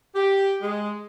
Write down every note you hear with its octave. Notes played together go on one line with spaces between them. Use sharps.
G4
G#3